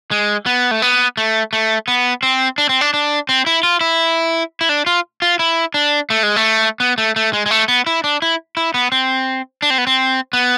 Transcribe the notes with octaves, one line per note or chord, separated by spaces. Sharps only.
G#3
B3
A3
B3
A3
A3
B3
C4
D4
C4
D4
D4
C4
E4
F4
E4
E4
D4
F4
F4
E4
D4
A3
G#3
A3
B3
A3
A3
G#3
G#3
A3
B3
E4
D4
E4
E4
B3
C4
D4
C4
B3
C4
B3